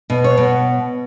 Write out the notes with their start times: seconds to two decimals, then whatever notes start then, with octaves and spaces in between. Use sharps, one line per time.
0.10 B2
0.24 C#5
0.37 B2